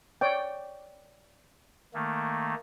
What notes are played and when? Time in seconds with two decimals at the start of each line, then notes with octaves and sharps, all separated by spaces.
0.21 C#5 D5 G5
1.94 D#3 A3 A#3